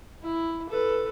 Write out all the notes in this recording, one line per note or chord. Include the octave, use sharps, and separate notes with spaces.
E4
A4 B4